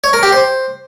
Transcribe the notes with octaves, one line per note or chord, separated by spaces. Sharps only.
C#5
A#4
G4
C5